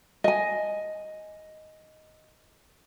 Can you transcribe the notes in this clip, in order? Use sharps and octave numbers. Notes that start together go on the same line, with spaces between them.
D#5 G#5